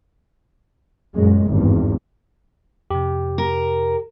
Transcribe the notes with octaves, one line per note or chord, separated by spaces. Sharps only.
F#2 A#2 G#3
G#1 E2 G2
F2 C3 G4
A#4